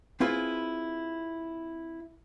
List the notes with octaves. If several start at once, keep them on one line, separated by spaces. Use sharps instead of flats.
C4 E4 F4 G#4 B4